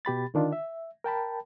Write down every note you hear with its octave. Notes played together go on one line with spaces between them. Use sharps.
B2 G4 B5 A6
D3 D#3 D4 F4
E5
A#4 G5 A5 B5